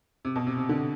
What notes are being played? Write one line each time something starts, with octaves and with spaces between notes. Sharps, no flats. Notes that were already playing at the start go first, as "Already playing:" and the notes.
C3
B2
C3
C3
D3